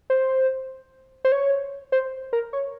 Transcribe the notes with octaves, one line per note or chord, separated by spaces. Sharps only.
C5
C5
C#5
C5
A#4
C#5